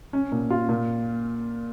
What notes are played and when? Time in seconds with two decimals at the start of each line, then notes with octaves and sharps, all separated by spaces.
0.13 C#4
0.32 A#2
0.50 F4
0.69 A#2